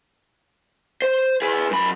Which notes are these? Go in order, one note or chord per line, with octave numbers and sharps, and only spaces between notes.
C5
G#4 B4
F#2 B5